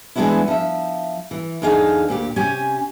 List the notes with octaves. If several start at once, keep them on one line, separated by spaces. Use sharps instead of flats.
E3 G#3 A#3 B3 D4 E4
F3 E5
E3
E2 D3 D#4 G#4 F5
D2 A#2 G4
C3 C#4 G4 G#5